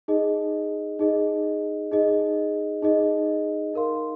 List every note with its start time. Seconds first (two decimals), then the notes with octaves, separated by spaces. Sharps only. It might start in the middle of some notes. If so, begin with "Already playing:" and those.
0.08 D#4 G#4 D#5
0.99 D#4 G#4 D#5
1.91 D#4 G#4 D#5
2.82 D#4 G#4 D#5
3.73 D#4 A#4 F5 C6